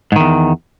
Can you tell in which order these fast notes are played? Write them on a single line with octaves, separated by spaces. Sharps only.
G#2 D#3 E2